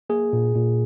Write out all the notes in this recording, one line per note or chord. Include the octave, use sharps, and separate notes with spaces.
A#3 G#4
A#2
A#2